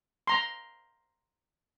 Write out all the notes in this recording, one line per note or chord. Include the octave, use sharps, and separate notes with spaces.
A#5 C6